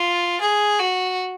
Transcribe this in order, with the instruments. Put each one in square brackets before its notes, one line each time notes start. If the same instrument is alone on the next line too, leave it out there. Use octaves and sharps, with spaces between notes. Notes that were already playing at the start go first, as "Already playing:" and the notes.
Already playing: [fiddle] F4
G#4
F#4